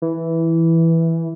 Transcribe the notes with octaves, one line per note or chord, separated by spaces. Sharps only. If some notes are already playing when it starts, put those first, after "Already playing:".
E3